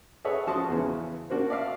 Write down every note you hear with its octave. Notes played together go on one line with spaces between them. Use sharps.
G#4 A4 B4 C#5 E5 F#5
F3 F#4 A5 C6 C#6 D#6
E2 C#3 E3
A#3 D4 F#4 A#4 C5
D5 E5 F5